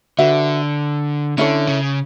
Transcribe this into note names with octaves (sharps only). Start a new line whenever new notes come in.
D3 F#4 B4 E5
D3 C#4 E4 A4 C#5
C#3